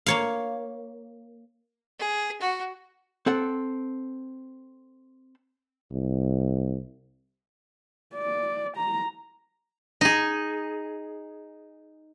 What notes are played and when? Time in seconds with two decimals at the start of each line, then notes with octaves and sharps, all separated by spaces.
0.06 A#3 C#5 F5
2.00 G#4
2.41 F#4
3.26 C4 A4 F#5
5.91 C2
8.15 D5
8.77 A#5
10.01 D#4 G#4